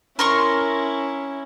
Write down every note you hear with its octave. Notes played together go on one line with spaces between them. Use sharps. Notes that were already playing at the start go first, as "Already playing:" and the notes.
C#4 E4 A#4 C6 C#6